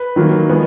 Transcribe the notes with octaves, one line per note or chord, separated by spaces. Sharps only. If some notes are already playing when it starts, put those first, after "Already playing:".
Already playing: B4
D#3 F#3 A#3
F3 G#3 B3